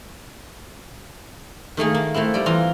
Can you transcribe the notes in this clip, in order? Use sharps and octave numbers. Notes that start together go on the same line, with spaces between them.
D#3 A3 A#3 G#4
A#3
A3 A#3 C4 E4
G3 D5
E3 F4 A#5